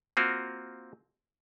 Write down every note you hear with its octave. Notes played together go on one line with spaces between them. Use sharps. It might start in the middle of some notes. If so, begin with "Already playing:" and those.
A#3 C4 F4 F#4 A#4